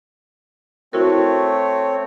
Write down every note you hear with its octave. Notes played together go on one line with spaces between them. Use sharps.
A3 C4 E4 F#4 A#4 C#5